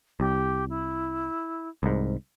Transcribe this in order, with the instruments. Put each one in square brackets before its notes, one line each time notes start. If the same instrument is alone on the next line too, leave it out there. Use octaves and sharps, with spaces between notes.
[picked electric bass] C2 [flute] G4
[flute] E4
[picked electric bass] C2 G#2